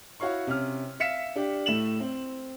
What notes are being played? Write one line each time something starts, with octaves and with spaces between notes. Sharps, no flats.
E4 F#4 C#5 F5 C#6
C3 C#4 F6
E5 F5 B6 C#7 E7
D4 G4
A2 A3 E7 F#7
C4